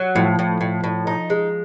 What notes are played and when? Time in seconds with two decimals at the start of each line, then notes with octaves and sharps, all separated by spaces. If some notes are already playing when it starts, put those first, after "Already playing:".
Already playing: F#3
0.15 A2 F3
0.39 A2
0.61 A2
0.84 A2
1.07 D#4
1.30 G#3